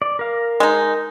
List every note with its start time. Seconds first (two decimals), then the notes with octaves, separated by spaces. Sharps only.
0.02 D5
0.19 A#4 F5
0.60 G#3 D#4